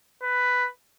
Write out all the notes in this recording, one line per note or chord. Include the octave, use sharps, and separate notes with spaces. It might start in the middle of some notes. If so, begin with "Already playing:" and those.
B4